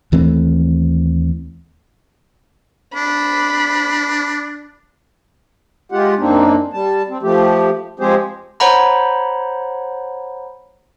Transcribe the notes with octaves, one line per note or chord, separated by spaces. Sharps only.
D#2 E3 A3 C4
D4 B5
G#3 F4 G4 F#5
F#2 A#3 C4 D4 D#4
G3 A5
C4
F3 A3 G4
F3 G#3 C4 G4 G#4 C5
C5 C#5 F#5 A#5 B5